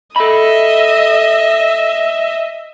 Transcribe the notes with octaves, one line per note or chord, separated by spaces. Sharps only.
A4 D#5 E5 B5